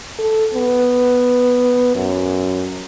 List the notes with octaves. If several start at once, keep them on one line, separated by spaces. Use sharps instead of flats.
A4
B3
F#2